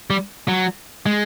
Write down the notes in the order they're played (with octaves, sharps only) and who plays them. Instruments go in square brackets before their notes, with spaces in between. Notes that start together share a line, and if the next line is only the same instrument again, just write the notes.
[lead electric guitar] G3
F#3
G#3